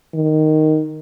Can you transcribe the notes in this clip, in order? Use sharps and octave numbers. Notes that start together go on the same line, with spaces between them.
D#3